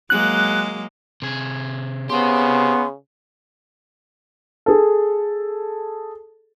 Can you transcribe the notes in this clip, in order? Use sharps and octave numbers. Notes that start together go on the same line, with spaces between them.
F#3 G#3 A#3 F#6
C3 G#4
C#3 B3 G4 C5 C6
G#4 A4